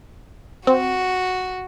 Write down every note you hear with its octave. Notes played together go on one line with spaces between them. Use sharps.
C4 F#4